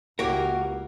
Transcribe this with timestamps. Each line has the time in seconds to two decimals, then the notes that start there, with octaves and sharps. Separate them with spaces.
0.19 C#2 A#3 E4 F#4 G4 A#4 C#5